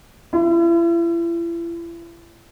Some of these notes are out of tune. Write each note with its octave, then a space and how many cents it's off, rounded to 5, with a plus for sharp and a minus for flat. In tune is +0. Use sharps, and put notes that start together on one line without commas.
E4 +40